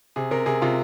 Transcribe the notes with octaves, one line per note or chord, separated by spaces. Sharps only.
C3 G#4
C3 A#4
C3 G#4
C3 F4